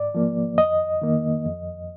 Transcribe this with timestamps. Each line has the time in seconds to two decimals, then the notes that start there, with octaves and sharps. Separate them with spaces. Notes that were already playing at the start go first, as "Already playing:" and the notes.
Already playing: G#2 D5
0.15 F3 A#3
0.58 F2 D#5
1.02 D#3 A#3
1.45 F2